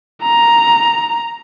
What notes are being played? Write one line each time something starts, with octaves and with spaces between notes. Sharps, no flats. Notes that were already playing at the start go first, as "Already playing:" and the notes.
A#5